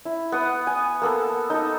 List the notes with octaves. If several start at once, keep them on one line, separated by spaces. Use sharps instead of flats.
E4
B3 F#5 D#6
G#5
A#3 B3 A4
D#4 A4